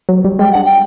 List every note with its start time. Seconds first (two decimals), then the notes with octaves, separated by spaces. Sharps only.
0.09 F#3
0.25 G3
0.39 G#3 G5
0.52 D4 F#5
0.65 G5